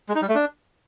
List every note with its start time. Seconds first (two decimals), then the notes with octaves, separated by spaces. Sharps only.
0.09 G#3
0.15 D#4
0.22 G3
0.29 A3
0.35 D4